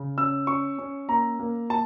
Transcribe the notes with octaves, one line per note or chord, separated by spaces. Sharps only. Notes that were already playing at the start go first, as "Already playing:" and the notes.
Already playing: C#3
C#4 E6
C#4 C#6
C#4
A#3 A#5
A#3
A#3 A5